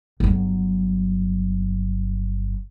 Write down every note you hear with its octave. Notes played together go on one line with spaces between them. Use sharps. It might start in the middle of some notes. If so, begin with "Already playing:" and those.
G1 F#3